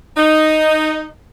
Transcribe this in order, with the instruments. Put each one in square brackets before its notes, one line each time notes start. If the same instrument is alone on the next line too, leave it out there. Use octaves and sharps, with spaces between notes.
[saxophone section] D#4